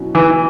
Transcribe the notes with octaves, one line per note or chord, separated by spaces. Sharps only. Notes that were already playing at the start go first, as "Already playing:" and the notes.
Already playing: B2 F#3 C#4 E4
E3